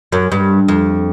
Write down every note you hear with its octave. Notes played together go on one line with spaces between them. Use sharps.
F#2
G2
F2